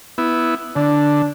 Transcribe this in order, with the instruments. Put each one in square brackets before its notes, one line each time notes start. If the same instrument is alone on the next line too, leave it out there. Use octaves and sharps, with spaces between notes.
[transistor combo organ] B3 E4
[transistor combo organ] D3 [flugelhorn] D4